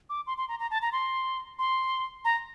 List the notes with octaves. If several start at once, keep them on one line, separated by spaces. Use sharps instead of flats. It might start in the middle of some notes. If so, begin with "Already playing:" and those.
D6
C6
C6
A#5
A#5
A5
A#5
C6
C6
A#5